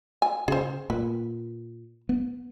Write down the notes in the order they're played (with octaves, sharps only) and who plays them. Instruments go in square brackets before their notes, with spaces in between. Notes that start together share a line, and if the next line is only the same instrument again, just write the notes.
[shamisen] G#5
[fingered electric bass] C#3 [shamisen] G#4 C5
[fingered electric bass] A#2 [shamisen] B4
[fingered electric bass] B3